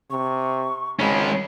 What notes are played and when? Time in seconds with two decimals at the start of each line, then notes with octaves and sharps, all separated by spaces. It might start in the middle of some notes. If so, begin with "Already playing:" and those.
0.10 C3 C#6
0.99 G#1 G#3 C#4 B5